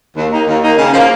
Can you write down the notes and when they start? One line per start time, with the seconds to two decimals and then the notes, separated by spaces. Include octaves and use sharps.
0.16 D#2
0.32 D#3 A#3 D#4
0.47 D#2
0.62 D#3 A#3 D#4
0.78 C#3
0.93 F3
0.98 A#3